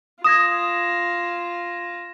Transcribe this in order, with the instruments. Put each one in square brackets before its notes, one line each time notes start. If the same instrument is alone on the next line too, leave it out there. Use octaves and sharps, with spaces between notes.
[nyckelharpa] F4 [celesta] D#6 [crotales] G#6 A#6 E7